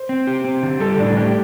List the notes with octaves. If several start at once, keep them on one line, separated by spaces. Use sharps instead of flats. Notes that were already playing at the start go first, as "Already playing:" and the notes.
Already playing: C5
C4
G4
C4
D3
G3 A4
A2 D4
D4 G4